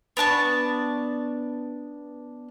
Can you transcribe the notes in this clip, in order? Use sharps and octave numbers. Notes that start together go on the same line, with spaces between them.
B3 D4 A5 C#6